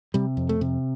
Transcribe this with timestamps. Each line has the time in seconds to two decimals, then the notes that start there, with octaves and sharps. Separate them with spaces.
0.14 C3 G3
0.37 F2
0.49 A3
0.61 C3